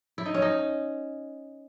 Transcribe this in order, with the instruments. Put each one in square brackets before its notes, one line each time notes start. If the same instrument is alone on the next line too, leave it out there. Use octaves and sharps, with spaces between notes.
[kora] E4
D#4
C#4
D#4